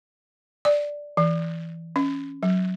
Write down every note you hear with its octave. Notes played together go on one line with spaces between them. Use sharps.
D5
E3
C#4
F#3